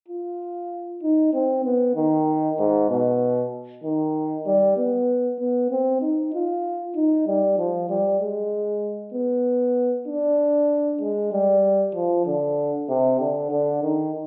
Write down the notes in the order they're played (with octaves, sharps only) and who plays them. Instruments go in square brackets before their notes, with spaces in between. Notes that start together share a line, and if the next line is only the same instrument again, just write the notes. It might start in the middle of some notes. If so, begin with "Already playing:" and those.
[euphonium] F4
D#4
C4
B3
D#3
G#2
B2
D#3
G3
B3
B3
C4
D#4
F4
D#4
G3
F3
G3
G#3
B3
D4
G#3
G3
F3
D3
C3
D3
D3
D#3